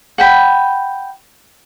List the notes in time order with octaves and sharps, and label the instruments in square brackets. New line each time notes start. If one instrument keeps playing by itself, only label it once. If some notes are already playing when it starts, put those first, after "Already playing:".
[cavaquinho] F#5 G5 B5